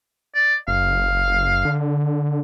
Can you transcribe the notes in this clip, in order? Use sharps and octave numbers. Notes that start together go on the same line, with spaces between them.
D5
F#1 F5
D3